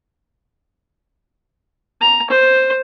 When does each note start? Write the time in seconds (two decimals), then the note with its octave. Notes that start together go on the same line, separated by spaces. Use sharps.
2.01 A#5
2.30 C5